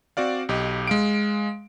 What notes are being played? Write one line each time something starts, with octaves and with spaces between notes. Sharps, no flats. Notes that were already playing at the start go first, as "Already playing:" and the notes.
C4 F#4 D5 F5
B1 G4 D#5
G#3 F5 D7